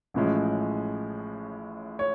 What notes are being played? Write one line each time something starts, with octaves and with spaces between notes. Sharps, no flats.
A1 A2 F3 G#3 C#4
C#5